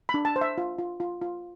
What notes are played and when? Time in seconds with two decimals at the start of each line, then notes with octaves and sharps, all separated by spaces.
0.09 B5
0.14 D4
0.25 A5
0.36 C5
0.41 E5
0.58 F4
0.79 F4
1.00 F4
1.22 F4